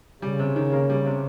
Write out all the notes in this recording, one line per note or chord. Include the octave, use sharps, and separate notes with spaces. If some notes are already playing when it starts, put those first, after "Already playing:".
C#3 G3
C3
D#3
A#3
G3
C3